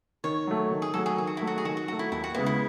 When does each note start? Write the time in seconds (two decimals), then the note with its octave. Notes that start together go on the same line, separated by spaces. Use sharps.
0.24 D#3 C#5
0.47 F#3 A3
0.71 D#3
0.82 G#4
0.94 F#3 A3 A4
1.06 G#4
1.18 D#3 G#4
1.27 F#4
1.37 F#3 A3 E4
1.47 F#4
1.58 G#4
1.65 D#3 F#4
1.77 F#4
1.88 F#3 A3 F#4
1.99 E4
2.12 D#2 E4
2.24 F#4
2.34 C#3 G#3 B3 E4
2.46 E4